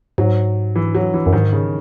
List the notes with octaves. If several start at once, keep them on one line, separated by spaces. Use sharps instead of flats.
G#2 F#3
E3
F#3
E3
F#2
G#2 D#3
C#3